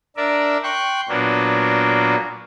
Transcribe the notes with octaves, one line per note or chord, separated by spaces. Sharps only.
D4 A#4 D5 E5
G5 C6 C#6 F#6
A#2 F#3 A#3 B3 D4